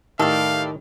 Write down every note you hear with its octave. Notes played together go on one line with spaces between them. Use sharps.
A2 D#3 G4 A4 D5 F5